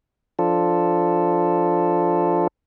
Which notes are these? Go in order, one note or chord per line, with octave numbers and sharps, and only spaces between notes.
F3 D4 F4 A4